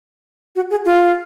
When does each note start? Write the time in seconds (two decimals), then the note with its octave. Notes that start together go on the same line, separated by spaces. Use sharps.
0.56 F#4
0.70 G#4
0.85 F4